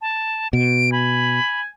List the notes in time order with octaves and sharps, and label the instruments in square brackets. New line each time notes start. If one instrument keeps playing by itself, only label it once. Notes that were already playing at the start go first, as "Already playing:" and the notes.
[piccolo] A5
[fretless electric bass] B2 [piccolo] D7
[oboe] G#5 [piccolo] B5